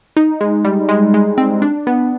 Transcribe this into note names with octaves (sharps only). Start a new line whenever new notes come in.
D#4
G#3
G3
G#3
G#3
C4
D4
B3